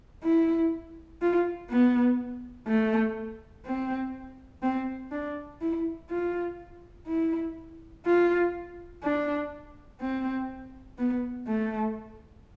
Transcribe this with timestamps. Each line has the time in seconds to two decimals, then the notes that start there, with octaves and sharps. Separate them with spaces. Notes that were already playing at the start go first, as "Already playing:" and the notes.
0.23 E4
1.21 F4
1.70 B3
2.67 A3
3.65 C4
4.63 C4
5.12 D4
5.61 E4
6.10 F4
7.07 E4
8.06 F4
9.03 D4
10.00 C4
10.98 B3
11.48 A3